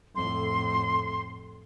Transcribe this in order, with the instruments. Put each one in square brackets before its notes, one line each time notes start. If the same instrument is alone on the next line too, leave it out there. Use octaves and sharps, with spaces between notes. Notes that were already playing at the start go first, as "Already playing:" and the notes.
[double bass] F2 A2 [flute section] C6